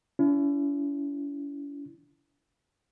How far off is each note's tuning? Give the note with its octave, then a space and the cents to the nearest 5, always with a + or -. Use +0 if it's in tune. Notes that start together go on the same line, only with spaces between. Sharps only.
C#4 +45 E4 +30